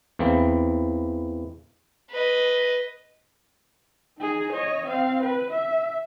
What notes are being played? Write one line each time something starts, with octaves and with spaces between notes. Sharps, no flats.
E2 E3 A#3 C4
B4 D#5
D#4 G#4
C#5 D#5
C4 F5
B4
E5